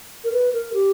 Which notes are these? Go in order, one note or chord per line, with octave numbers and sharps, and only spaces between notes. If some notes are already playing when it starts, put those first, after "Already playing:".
A#4
B4
A#4
G4